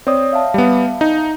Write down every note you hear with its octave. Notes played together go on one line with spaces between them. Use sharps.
C4 C#5 D5 D#6
E5 F5 A5
G3 B3
D#4